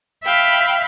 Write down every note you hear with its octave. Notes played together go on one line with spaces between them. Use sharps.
E5 F5 G5 B5